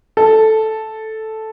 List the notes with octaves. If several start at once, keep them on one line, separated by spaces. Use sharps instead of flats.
A4